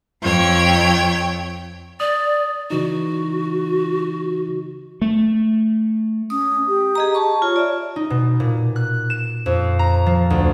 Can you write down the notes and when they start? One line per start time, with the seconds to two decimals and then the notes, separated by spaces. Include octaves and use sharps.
0.22 F2 C#5 G5 G#6
2.00 D5 D#6
2.70 C#3 E3 D#4 F#4
5.02 A3
6.30 C#4 D#6
6.68 G4
6.95 G#4 D#5 A#5
7.15 A5 C#6
7.42 F4 C#5
7.56 D5 E5
7.96 D#4
8.10 B2
8.40 A#2
8.76 F#6
9.10 E7
9.46 F2
9.79 A#5
10.06 F3
10.30 D2